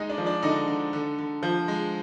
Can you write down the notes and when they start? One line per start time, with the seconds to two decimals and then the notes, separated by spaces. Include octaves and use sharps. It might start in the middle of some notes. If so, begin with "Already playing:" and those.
Already playing: G#3 D#4 D#5
0.09 D4 D5
0.18 F3
0.26 D4 D5
0.42 D3 D#4 D#5
0.68 D3
0.93 D3
1.19 D3
1.43 F3
1.68 G#3